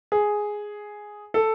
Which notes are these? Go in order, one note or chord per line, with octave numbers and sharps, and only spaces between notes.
G#4
A4